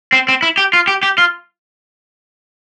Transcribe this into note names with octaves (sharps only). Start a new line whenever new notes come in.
C4
C4
E4
G4
F4
G4
G4
F4